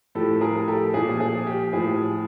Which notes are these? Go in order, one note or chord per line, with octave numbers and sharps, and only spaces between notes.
A2 F3 G4 A4
G#4 A#4
G4 A4
A#2 F3 G#4
G#4
G4
A2 F3 G#4